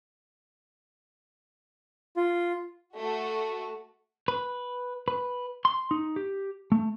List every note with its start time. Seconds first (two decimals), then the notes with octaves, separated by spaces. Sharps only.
2.17 F4
2.97 A3 F#4
4.28 B4
5.08 B4
5.65 C6
5.91 D#4
6.16 G4
6.72 A3